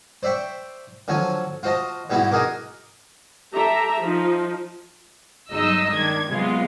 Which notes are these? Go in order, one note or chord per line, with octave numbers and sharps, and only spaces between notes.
C5 D5 E5 G5 C#6
D3 F3 F#3 C#5 G#5
F4 F#4 C5 D#5 A5
G#2 G3 B3 E4 F#4 G4
D#4 F#4 G#4 A#4 D6
G4 A4 E5 A#5
F3 D#4
G1 F#3 G#3 D#4 D#5 E6
D#3 D4 G#6
C3 F#3 G#3 B3 F4